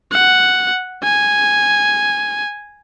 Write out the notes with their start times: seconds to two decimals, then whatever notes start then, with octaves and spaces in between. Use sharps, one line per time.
0.12 F#5
1.03 G#5